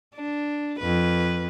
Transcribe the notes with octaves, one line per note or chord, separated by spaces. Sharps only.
D4
F2 B4